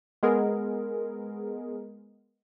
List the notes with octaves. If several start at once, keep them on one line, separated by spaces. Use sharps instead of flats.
G#3 B3 G#4 A#4